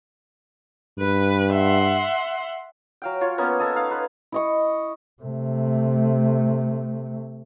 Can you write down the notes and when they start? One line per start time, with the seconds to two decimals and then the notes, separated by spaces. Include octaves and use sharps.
0.99 G2 B4
1.52 E5 F#5 C6
3.02 F#3 F5 G5
3.21 F4 C#5
3.38 A#3 B3 C#4 G#5
3.59 B3 A4 D#5 G#5
3.74 D#4 F5
3.91 B4
4.32 E4 D#5 C#6
5.22 C3 A3